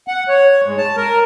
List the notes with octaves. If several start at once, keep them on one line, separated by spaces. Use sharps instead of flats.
F#5
C#5
G#2
A5
A#4